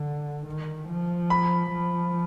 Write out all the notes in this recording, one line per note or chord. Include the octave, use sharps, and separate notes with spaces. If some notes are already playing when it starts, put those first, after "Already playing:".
Already playing: D3
D#3
F3
B5
F3